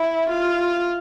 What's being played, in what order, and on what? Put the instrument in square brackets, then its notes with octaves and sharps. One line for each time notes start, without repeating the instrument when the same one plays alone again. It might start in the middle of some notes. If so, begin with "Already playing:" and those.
Already playing: [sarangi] E4
F4